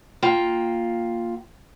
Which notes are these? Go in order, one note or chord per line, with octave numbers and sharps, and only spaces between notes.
A#3 F4 G5